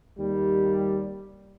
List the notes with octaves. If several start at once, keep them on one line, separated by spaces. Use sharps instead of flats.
D#2 G3